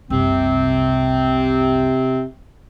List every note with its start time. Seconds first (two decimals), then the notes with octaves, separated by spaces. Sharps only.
0.10 F#1 C2 C3 C4